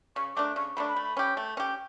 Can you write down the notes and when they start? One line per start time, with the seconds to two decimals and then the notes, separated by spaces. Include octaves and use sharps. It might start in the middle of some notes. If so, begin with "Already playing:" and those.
0.16 C#3 C#6
0.36 F#3 A3 D4 D6
0.56 C#3 C#6
0.76 F#3 A3 D4 B5
0.87 B5
0.96 A3
1.17 C#4 G4
1.37 A3
1.57 C#4 G4